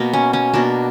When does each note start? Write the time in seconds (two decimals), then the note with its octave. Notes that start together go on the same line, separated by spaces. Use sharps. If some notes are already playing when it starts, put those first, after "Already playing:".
Already playing: B2 A#3
0.13 C#4
0.33 C#4
0.53 B2 A#3 D4